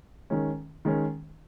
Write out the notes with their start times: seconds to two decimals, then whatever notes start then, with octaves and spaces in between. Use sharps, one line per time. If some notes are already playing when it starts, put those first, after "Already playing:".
0.30 D#3 G#3 C#4
0.85 D#3 G#3 C#4